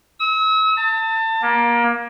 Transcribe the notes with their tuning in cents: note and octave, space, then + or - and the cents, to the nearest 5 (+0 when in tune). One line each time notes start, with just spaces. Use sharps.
E6 -40
A5 +30
A#3 +25